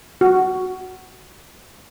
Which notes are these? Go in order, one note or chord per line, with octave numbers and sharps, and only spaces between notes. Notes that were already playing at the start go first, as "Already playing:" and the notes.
F#4